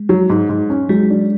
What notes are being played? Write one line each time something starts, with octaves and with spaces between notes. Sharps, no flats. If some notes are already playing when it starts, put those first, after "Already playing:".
Already playing: G#3
F#3
G#2
G#2
C#4
F#3 G#3
D4